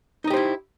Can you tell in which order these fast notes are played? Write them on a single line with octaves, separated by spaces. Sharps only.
D#4 D#5 G4 C5 E4